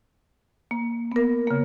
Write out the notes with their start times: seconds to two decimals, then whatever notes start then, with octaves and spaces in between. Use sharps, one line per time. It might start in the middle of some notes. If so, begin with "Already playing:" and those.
0.71 A#3
1.12 B3 A#4
1.47 C#3 A#3